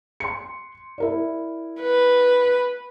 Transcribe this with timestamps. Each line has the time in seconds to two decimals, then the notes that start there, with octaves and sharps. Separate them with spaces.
0.20 C6 C#7
0.98 E4 A#4 D5
1.81 B4